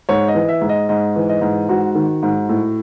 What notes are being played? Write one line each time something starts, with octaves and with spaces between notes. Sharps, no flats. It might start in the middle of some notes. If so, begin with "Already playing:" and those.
G#2 C#5
D#5
E3
E5
G#2
D#5
G#2 D#5
E3
D#5
G#2
G#2 F#4
D#3
G#2
A2